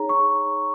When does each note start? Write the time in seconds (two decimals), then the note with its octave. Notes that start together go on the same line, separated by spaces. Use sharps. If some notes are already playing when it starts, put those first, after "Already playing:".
Already playing: D#4 G#4 C#5 A#5
0.09 C#6